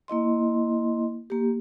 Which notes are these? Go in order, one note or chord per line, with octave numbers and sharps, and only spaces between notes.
A#3 E4 D#5 C6
A#3 G4